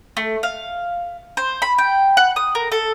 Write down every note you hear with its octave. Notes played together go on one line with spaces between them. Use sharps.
A3
F5
C5
B5
G5
F#5
D#6
A#4
A4